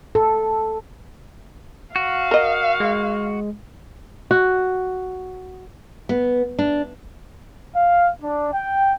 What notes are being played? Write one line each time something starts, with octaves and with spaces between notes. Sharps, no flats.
A4
F#4 F5
A#4 D#5
G#3
F#4
B3
D4
F5
D4
G5